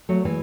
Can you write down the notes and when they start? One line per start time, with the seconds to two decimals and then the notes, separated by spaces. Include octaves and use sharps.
0.09 F#3 A3
0.25 E3 G#3